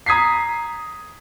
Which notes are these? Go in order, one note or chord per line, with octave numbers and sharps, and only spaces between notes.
A#5 D#6 G#6 B6 C7